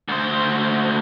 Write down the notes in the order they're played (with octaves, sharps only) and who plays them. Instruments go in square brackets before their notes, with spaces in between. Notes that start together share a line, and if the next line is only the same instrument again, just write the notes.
[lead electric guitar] D2 C5